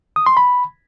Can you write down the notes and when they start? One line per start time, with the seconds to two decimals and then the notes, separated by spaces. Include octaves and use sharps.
0.16 D#6
0.26 C6
0.37 B5